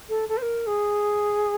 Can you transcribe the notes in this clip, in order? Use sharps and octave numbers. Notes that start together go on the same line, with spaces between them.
A4
A4
C5
A#4
G#4